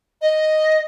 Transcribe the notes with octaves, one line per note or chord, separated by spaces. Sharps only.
D#5